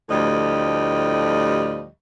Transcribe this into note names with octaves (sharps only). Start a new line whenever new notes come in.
D2 A2 F3 G3 G4 D#5